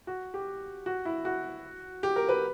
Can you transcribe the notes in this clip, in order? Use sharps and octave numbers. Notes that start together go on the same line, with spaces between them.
F#4
G4
F#4
E4
F#4
G4
A#4
B4